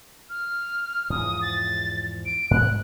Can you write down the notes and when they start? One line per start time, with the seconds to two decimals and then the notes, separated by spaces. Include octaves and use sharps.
0.29 F6
1.10 E2 G#2 F3 D#6
1.42 A6
2.26 D7
2.51 G#2 B3 F#6